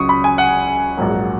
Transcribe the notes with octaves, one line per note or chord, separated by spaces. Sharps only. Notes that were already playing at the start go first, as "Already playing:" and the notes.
Already playing: C#2 C#3 F#3 C#6 D#6
B5
G#5
F#5
A#1 G#2 F#3 A#3